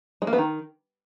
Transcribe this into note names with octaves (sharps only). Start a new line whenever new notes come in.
G#3
A#3
B3
D#3